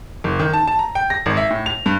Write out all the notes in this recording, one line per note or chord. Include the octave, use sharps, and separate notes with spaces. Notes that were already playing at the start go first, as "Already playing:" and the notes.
F#1
D#3
A5
A5
A#5
G5
A#6
G#1
E5
A2
F7
G2